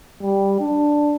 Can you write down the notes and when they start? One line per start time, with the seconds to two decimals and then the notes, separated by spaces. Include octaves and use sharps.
0.22 G3
0.60 D4